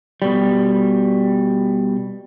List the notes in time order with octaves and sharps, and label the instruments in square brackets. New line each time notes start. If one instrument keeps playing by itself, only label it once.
[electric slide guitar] B2 G3